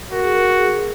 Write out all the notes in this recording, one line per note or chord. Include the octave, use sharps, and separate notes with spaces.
F#4 A#4
G#4
A#4
A#4
G#4
G#4